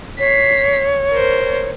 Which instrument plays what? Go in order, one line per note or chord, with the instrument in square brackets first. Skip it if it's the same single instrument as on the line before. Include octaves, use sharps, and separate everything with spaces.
[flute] C#5 [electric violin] B6 C7
[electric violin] A#4 C5